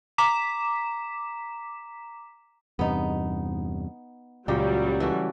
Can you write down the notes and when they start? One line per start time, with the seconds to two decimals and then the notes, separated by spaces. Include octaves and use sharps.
0.18 A#5 D6 B6 E7
2.79 E2 G2 C3 B3 D#4
4.48 C#2 A#2 C#3 F#3 G3 G4
5.00 E3 A3 F#4